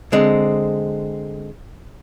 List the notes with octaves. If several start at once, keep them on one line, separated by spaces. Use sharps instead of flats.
D3 G#3 C4